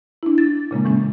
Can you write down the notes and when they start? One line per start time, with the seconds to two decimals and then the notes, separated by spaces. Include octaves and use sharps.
0.23 D4 E4
0.38 A6
0.71 A#2 C#3 G#3 A#3
0.85 A2 E3 G#3 C#4